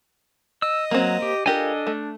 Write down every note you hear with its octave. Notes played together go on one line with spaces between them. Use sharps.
D#5 E6
F#3 A#3 C4
G4
D4 F4 G4 A4 A#4 D#5 G#5
A3